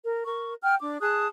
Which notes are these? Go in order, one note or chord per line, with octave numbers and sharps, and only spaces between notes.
A#4
A#4 C#6
F#5 G5 F6
D4 D6
G#4 A5 D#6 F#6